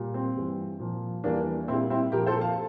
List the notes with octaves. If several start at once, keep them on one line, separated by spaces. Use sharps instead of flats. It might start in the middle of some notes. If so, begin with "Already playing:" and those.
Already playing: A#2 G3
C4
G2 E3 G3
A#2 F3
E2 E3 G3 A#3 D4
A#2 C4 E4
G3
C4 E4
A#2 F3 G4 A#4
A4 C5
F5 A5